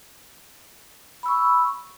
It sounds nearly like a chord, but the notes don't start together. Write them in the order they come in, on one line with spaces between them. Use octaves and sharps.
B5 E6 C#6